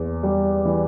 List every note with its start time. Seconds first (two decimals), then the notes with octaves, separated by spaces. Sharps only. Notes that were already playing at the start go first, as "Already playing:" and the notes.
Already playing: E2
0.23 G3
0.65 E3